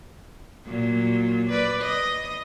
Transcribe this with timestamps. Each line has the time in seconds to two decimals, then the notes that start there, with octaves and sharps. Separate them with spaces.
0.66 A#2 F#3
1.50 B4 D5
1.82 D#5